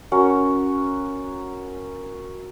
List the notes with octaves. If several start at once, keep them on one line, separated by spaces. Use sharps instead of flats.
C#4 F#4 A#4